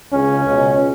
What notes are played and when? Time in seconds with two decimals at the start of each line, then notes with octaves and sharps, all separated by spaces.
0.12 C#2 C#3 C#4
0.45 C#2 B2